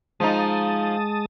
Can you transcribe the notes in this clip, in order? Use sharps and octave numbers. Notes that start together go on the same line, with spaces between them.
F3 G#3 D#4 A5 D#6